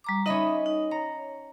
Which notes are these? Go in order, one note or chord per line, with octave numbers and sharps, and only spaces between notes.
G3 A#5 D6
C#4 D#4 D#5 E5 B5
D#4
C#5 A#5